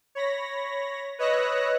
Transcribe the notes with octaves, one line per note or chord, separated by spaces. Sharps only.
C#5 B5 A#6
B4 C#5 D#5 E6 F#6 A#6